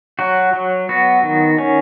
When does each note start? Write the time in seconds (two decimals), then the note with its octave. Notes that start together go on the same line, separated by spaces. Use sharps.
0.19 F#3 F#4
0.53 F#3
0.89 B3 F#4
1.23 D#3
1.59 C#4